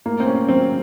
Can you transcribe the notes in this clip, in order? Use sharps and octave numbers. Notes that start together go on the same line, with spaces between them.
A2 A#3
C4
C#4
F#3 C4